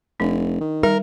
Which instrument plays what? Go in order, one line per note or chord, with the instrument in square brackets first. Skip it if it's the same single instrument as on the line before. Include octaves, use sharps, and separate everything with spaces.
[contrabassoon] F1 [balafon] D4
[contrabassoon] D#3
[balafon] G3 [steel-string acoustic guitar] A#4